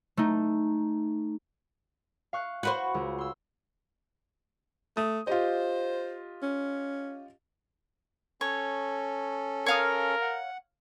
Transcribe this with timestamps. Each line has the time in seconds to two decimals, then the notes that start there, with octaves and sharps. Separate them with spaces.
0.17 A3 D#4
2.33 F5 C#6 F#6
2.63 F#4 B4 C5 B5
2.94 C#2
3.18 C6 E6
4.97 A3 D#6
5.27 F4 G4 C5 D#5
6.43 C#4
8.41 C#4 A4 C#5
9.66 A#4 C#5 F5 D#6
10.22 F#5